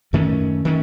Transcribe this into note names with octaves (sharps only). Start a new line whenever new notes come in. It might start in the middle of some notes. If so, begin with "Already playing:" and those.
F#2 D#3 A3 C#4
D#3 A3 C#4